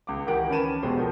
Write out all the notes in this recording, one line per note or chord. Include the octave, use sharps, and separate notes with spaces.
C#2 D6
D#3 E3 G4 A#4 F#5 D7
C#4 B4 A5 D#7 E7
E1 B2 G#3 G4 A4 C5
D#3 F3